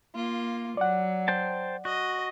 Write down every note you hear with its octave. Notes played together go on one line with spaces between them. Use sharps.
A#3 F4
F#3 D5 F#5
C5 G5 A5
F#4 D#5